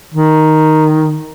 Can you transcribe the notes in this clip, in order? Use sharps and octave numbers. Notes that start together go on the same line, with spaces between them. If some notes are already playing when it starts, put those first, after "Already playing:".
D#3